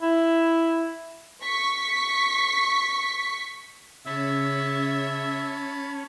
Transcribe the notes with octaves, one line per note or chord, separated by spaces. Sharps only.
E4
C#6 B6
C#3 C#4 E5 A5 B5